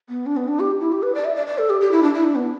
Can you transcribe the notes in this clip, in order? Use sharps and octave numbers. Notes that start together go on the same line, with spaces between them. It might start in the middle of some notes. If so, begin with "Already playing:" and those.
B3
D4
B3
D4
G4
E4
G4
B4
D5
E5
D5
D5
A4
G4
G4
E4
D4
E4
D4
B3